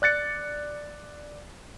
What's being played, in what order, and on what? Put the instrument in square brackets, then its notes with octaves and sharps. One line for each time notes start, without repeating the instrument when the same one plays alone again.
[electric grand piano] D5 F#6 A6 C#7